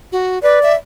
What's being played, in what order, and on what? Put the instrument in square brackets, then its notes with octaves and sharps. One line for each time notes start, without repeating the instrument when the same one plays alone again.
[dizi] F#4
[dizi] B4 [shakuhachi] D5
[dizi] E5